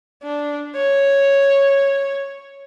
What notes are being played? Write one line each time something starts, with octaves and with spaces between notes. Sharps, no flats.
D4
C#5